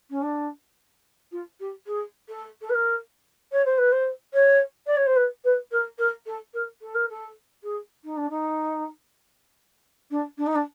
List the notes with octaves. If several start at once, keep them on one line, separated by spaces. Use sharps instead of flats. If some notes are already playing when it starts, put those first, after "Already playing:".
C#4
D4
F4
G4
G#4
A4
A4
B4
A#4
C#5
C5
B4
C5
C#5
D5
C#5
C5
B4
B4
A#4
A#4
A4
A#4
A4
A#4
A4
G#4
D#4
D4
D#4
D4
D4
D#4
D4